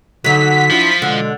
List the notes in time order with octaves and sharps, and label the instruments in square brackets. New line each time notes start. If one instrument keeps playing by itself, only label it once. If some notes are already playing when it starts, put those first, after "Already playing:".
[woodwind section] D3 [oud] F#3 D#4 [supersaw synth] B6
[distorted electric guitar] F3 [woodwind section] D4 E4 F4
[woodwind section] B2 G#3 [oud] D3